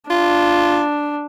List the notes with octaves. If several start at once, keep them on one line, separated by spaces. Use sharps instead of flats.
D4 F4